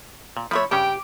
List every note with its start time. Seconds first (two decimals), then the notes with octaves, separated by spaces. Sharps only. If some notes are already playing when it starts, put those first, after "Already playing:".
0.37 A#2
0.51 F3 A3 C#5 E5 B5
0.71 G2 C#3 C#4 G4 G5